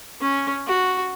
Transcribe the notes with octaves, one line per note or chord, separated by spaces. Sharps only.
C#4
F#4